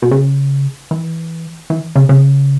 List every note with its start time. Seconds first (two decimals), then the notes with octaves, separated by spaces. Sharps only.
0.02 B2
0.11 C#3
0.91 E3
1.70 E3
1.96 C#3
2.09 C#3